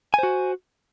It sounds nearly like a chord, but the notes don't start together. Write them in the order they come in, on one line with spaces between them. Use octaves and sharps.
G#5 C5 F#4